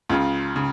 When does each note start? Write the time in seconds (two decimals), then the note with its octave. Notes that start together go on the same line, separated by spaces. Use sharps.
0.09 C#2 C#3 F4
0.56 C#3